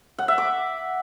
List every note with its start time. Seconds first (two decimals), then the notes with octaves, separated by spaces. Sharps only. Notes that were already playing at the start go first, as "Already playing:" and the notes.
0.18 F#5
0.28 E5
0.38 D6